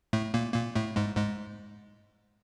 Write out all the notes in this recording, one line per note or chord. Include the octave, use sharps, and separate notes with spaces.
A2 A3
A#2 A#3
A#2 A#3
A2 A3
G#2 G#3
G#2 G#3